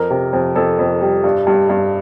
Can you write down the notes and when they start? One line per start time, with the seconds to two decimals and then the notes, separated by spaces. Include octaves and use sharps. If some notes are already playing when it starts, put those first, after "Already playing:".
Already playing: F2 A#4
0.10 C3
0.33 F2
0.56 F2 A4
0.79 F2
1.01 G3
1.24 G2
1.47 G2
1.69 G2